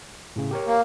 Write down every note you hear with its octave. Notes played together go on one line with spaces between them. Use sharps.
A2 C#3
G4 A#4 C#5
A#3